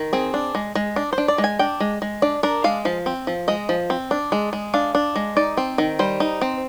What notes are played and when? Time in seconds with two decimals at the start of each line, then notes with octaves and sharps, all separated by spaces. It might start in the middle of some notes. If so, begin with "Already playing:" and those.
Already playing: D#3
0.13 C4 G#4
0.34 D4
0.55 G#3
0.75 G#3
0.96 D4
1.13 C5
1.18 D4
1.28 D5
1.38 G#3
1.44 G#5
1.59 D4 G5
1.80 G#3
2.02 G#3
2.22 D4 D5
2.43 D4 A#4
2.64 G#3 F5
2.85 F3 F5
3.06 C4
3.27 F3
3.48 G#3 D#5
3.69 F3
3.90 C4
4.11 D4
4.32 G#3
4.53 G#3
4.74 D4 F5
4.95 D4
5.16 G#3
5.37 D#4 D5
5.57 C4
5.78 D#3
5.99 G3 C5
6.20 D#4
6.41 C4